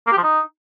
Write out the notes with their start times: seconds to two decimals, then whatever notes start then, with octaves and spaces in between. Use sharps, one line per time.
0.07 A#3
0.12 G4
0.18 F3
0.23 D#4